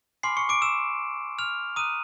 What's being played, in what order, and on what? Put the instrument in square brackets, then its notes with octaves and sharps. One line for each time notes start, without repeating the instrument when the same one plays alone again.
[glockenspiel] G#5 B5 C6 D6 F6 C7
C#6 C#7
D6 D7
E6 E7
F6 F7
A#5 D6 D#6 F#6 D#7